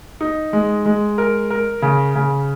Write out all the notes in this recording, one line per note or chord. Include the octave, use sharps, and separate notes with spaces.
D#4
G#3
G#3
A#4
A#4
C#3
C#3